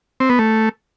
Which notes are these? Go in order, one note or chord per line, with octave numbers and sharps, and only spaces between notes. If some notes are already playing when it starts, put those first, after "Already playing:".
C4
B3
A3